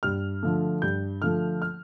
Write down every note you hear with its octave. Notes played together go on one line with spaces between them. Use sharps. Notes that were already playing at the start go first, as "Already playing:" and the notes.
G2 F6
D3 F3 A3
G2 G6
D3 F3 A3 F6
F6